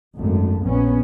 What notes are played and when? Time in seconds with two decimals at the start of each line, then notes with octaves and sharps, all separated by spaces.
0.17 G#1 F#2 A3
0.64 A#1 B3 C#4